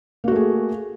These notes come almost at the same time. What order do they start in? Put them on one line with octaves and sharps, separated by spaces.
A#3 F#4 A3 G#4